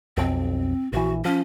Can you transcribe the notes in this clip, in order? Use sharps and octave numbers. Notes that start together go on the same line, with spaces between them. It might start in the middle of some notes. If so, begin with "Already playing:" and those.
B1 F2 C4
A#1 E3 F#4
F3 C#4